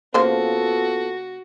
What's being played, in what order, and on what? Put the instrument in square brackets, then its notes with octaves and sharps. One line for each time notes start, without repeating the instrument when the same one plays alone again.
[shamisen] C#3 A#3 C5 [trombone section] B3 F4 A4 [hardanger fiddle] F#4